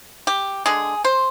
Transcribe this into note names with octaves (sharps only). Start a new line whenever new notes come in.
G4
D3 G#3 G#4
C5